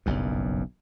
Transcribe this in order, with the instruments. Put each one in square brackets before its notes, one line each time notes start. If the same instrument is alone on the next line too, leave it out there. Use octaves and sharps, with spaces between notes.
[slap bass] F#1 B1 G2